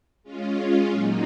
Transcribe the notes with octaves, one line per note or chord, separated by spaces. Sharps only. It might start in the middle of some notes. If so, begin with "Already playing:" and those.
G#3 C#4 F4
A#2 F#3 A#3 D#4